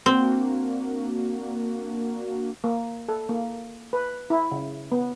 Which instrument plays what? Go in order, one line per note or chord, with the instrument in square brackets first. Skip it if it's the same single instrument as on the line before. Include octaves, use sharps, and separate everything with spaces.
[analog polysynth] A#3 D4 F#4 [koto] C4
[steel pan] A#3
A4
A#3
B4
E4
C#3
B3